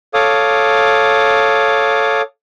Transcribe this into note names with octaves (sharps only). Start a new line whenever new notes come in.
A4 C#5 F5 D6 D#6